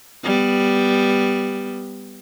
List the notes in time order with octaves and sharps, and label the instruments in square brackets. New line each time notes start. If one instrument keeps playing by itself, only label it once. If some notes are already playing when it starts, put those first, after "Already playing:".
[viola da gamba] G3 B3